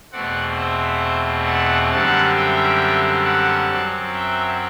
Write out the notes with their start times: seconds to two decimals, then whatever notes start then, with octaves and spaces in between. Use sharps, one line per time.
0.12 E2 B2 A3 C4 D5 F#5
0.57 C5 E5
1.46 F#5 A5
1.91 F#2 D3 G3 C4 F#5 A5
2.36 E5 G5
3.25 F#5 A5
3.70 F#2 F#3 C4
4.14 E5 G5